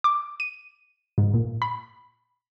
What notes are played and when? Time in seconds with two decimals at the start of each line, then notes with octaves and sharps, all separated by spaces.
0.04 D6
0.40 D#7
1.18 G#2
1.34 A#2
1.62 B5